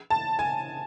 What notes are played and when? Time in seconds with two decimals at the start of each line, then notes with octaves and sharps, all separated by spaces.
0.10 A5
0.39 G#5